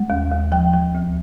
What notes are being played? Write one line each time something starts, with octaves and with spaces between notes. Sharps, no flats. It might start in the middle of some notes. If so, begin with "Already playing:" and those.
Already playing: G#3
D#2
D#2
F3 G5
F3
D2